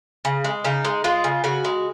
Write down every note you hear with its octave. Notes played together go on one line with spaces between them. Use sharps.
C#3
G#3
C#3 D#4
G#3
G#3 F4
C#3
C#3 F#4
G#3